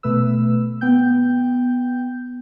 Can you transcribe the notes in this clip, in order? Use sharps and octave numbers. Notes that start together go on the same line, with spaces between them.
B2 A3 B4 E6
B3 G5 G6